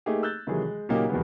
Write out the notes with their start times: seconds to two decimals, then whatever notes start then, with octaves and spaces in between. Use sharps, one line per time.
0.06 A3 A#3 D#4 G4 G#4
0.23 E6 F#6 G6 A6
0.47 C3 D#3 E3 F#3 G#3 G#4
0.65 G#3
0.89 A#2 C#3 F#3 A#3 D#4 G4
1.09 E2 B2 D#3 G3 G#3 B3